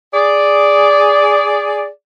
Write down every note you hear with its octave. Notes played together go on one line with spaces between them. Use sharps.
G#4 D5